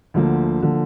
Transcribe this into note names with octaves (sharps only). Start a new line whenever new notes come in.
D2 D3 F3 A#3
D3 F3 A#3